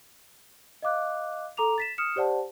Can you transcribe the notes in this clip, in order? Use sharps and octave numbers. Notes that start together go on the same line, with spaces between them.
D#5 F5 D6 F#6
A4 A#5 D6 F7
A6 B6 E7
D#6 F6 C#7 E7
G4 C5 D5 F#5 A5